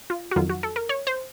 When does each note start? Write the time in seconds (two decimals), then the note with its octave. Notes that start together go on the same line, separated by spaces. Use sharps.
0.10 F4
0.31 F#4
0.36 F2 D#3 F#3 F4
0.49 F#4
0.63 A4
0.76 A#4
0.89 C#5
1.07 C5